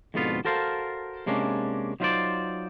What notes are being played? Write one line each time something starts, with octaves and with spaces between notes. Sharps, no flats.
F2 G#2 B2 D3 B3 F4
F#4 A4 A#4 C5 F5 A5
C3 G#3 A#3 C#4 D4
F#3 D#4 F4 A#4 C5 D5